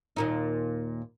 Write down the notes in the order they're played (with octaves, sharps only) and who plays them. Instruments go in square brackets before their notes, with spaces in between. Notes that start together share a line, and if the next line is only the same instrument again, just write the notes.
[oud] D#2 A#2 D#4